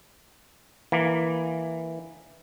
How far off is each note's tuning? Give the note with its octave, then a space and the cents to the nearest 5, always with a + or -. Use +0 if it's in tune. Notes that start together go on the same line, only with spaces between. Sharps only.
E3 +0 A#3 +0